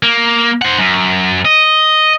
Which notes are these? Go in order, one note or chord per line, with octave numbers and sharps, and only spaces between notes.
A#3
C5 F#5
F#2
D#5